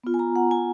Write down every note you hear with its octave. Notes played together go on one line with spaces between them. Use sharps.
B3 F4
G#5
A#5
F#5
G#5